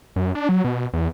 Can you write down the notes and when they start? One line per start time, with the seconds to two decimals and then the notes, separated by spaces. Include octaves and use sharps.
0.16 F#2
0.35 D4
0.49 F#3
0.64 B2
0.93 E2